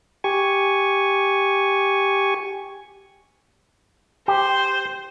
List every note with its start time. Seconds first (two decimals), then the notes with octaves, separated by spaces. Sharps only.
0.24 G4 G#5 C#6
4.28 G4 C5